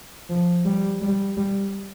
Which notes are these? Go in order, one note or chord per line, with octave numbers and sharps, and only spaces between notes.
F3
G3
G3
G3